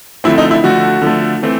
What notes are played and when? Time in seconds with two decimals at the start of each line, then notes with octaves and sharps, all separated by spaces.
0.24 D3 F3 A3 C4 E4
0.38 D#4
0.51 E4
0.64 D3 F3 A3 F#4
1.02 D3 F3 A3
1.42 E3 A3 C4